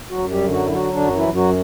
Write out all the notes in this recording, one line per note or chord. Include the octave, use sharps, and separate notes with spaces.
F#3 F#4
F#2
G3 G4
D3
F#3 F#4
E4
F#3 F#4
D3 D4
F#2 F#4
E3 E4
F#2
F#3 F#4